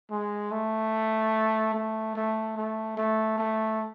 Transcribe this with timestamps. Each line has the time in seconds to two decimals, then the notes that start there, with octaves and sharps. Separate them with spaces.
0.11 G#3
0.51 A3
1.74 A3
2.16 A3
2.57 A3
2.97 A3
3.38 A3